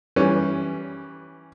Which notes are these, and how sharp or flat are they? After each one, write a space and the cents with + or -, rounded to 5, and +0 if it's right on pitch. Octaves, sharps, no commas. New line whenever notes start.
E3 +0 G3 -5 C#4 +0